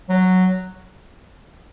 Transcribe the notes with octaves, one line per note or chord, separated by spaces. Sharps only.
F#3